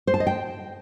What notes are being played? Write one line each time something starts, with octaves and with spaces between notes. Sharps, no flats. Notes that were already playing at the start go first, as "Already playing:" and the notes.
C5
A5
D#5
G5